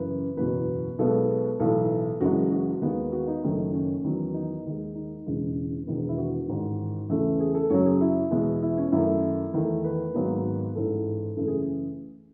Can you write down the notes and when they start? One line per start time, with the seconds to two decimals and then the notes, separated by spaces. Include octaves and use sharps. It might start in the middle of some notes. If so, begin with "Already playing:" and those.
Already playing: F#2 C#3 E3 B4
0.37 F#1 E2 B2 F#3 B4
0.98 B1 B2 G#3 B3 A4
1.60 B1 A2 E3 A4
2.21 F#1 F#2 E3 G#3 F#4
2.52 F#4
2.81 D#2 D#3 G#3 B3
3.12 F#4
3.28 D#4
3.43 F#1 F#2 D#3 A3
3.73 C#4
4.04 E2 D#3 F#3 B3
4.34 D#4
4.65 D#2 D#3 G#3
4.95 D#4
5.26 E1 E2 C#3 G#3
5.87 E1 E2 D#3 G#3 B3
6.09 E4
6.18 F#4
6.48 A1 G#2 D#3
7.09 E2 C#3 E3 A3
7.40 G#4
7.55 A4
7.70 F#2 C#3 F#3 C#5
7.85 G#4
8.01 E4
8.31 E2 B2 G#3 B3
8.62 E4
8.77 C#4
8.92 F#2 D#3 A3 E4
9.53 E2 D#3 A3
9.84 B4
10.14 G#1 G#2 D#3 F#3 B3
10.75 A1 G#2 E3 A4
11.37 F#2 C#3 E3 A3 A4
11.47 G#4